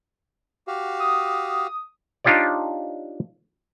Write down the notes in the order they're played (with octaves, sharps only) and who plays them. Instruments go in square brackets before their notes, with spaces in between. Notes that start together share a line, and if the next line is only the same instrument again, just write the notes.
[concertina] F#4 G4 F5
[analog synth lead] D#6
[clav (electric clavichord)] D4 D#4 F4 G4 C#5 D5